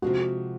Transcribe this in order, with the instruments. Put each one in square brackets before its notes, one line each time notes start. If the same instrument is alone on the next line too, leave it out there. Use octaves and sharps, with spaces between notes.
[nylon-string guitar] C3 F3 G#3 [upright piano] F#4